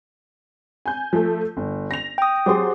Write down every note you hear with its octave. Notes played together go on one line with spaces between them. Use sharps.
G#5 G6
F3 A3
G1
A#6 F7
G5 D#6
F#3 G4 G#4 C5 C6